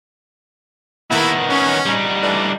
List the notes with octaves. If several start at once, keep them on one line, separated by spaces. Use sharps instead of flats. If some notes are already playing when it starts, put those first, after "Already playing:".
D#3 A#3 B3 E4
C#4
G3 D#4
E3 A3 D4